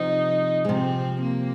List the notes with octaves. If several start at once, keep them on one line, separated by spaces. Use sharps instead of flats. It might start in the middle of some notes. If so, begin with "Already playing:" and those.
Already playing: C3 F3 D#4
G#3
C3 F3 C4
A#3